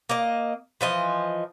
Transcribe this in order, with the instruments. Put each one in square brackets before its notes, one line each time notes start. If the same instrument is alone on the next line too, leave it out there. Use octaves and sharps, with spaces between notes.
[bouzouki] A#3 D#5
E3 F3 D#5